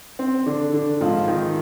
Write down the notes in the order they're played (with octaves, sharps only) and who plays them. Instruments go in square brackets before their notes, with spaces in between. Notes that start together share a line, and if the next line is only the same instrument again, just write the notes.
[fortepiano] C4
D3 D4
D3 D4
G#1 G#2 F3 F4
D#3 D#4